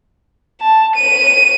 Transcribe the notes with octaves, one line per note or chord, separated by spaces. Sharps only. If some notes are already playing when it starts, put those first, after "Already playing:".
A5
D#7